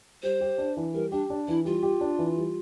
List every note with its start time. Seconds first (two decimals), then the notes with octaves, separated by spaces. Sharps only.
0.23 G3 C5
0.41 G4
0.58 D4
0.77 E3
0.94 G3 A#4
1.12 D4 G4
1.30 D4
1.48 E3 E4
1.65 G3 F4
1.83 G4
2.01 D4
2.19 E3
2.37 G3